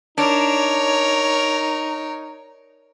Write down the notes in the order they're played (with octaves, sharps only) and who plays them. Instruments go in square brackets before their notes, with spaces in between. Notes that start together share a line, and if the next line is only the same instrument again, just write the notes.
[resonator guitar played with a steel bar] D4 [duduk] D#4 [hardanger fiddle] A#4 C#5